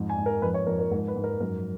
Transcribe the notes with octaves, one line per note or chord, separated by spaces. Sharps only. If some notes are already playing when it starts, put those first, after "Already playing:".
Already playing: F2 G#2
G#5
G#2
A#4
F2 B4
C#5
F2 A#4
A#4
G#2 A#4
B4
G#2
A#4
F#2 A#4